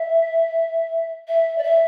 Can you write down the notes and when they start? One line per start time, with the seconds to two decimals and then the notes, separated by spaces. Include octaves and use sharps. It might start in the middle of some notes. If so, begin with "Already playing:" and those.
Already playing: E5
1.28 E5
1.58 D5
1.63 E5